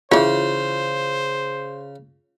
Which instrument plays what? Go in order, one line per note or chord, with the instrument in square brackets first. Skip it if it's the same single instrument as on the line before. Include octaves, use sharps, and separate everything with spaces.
[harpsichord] C#3 [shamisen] E3 C#5 [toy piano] F4 [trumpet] C5